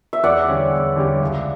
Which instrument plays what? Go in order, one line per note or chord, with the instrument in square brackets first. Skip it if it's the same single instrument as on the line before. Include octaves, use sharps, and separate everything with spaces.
[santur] E5
[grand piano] E2 [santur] D5 F#5
[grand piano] D3 G3 C#4 G4
E2
D3 G3 C#4 G4
C#2